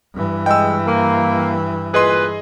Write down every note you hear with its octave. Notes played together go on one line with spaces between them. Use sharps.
G2 E3
G#3 G5 E6
A#3
A#2 G#3 G#4 B4 D#5 C6